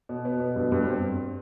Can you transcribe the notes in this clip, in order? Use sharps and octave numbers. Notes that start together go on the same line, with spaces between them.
B2
B3
B2
G2
G2
C4